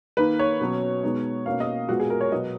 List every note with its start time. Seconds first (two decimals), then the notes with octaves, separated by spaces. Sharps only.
0.17 D#3 A#3 D#4 B4
0.39 C#5
0.61 B2 F#3 C#4
1.03 B2 G#3 B3 D#4
1.46 B2 A#3 C#4 F5
1.60 D#5
1.89 A#2 G#3 B3 F#4
2.00 G#4
2.10 A#4
2.21 C#5
2.32 B2 F#3 B3 D#5